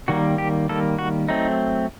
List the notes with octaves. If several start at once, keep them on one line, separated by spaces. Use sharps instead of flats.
D#3 G3 A#3 F#4
G4
D#3 G3 A#3 A4
F#4
F#3 A3 C4 D#4